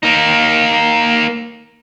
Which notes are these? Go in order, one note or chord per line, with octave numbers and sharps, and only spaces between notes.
A#3 D#4